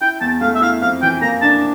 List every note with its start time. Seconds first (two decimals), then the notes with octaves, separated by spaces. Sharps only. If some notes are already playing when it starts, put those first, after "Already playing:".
0.01 E4 G5
0.21 E2 A5
0.41 A3 F5
0.55 E5
0.61 E4 F5
0.82 F2 F5
1.02 E3 G5
1.22 A#3 A#5
1.42 D4 A5